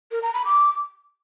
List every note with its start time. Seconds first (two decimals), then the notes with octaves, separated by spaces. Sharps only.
0.11 A#4
0.23 A#5
0.34 B5
0.45 D6